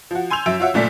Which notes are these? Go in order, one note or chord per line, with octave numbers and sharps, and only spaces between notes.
F3 F#4
G#5 C6 E6 G6 F7
F#2 F#3 E5 E6 D7
F4 F#4 C#5 E5 F#5
F#1 A#2 A3 D5 B6